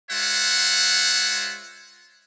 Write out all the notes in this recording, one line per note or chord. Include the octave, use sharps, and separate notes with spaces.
G#3 F4 C5 C#5 E5 F#5